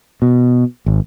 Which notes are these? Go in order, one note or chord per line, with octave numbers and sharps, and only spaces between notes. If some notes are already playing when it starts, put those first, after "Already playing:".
B2
G#1